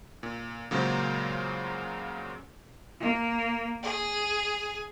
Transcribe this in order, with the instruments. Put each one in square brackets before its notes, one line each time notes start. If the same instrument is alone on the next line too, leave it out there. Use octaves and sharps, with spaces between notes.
[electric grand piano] A#2
A#2 C#3 F#3 G#3 A#3 C5
[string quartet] A#3
G#4